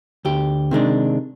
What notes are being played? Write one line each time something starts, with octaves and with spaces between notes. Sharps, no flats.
D2 G4
C3 D#3 G#3 D4